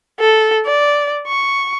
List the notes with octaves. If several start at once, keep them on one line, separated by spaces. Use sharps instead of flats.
A4
D5
C#6